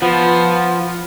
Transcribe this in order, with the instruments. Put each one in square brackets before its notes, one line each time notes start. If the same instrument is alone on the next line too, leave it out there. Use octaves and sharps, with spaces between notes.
[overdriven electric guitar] F3 [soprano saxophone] B3